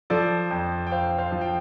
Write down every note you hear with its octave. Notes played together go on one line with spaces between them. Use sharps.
F3 A4 D5
F2
G5
F2 C5 F5
C5 F5
F3
G5